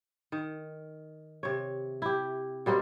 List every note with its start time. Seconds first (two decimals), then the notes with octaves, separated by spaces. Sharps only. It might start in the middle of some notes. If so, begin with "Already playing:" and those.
0.32 D#3
1.43 C3 C#5
2.02 E4 G4
2.66 B2 G3 A#3 C4